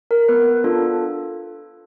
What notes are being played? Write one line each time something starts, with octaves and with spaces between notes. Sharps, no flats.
A#4
B3 B4
D4 F4 A4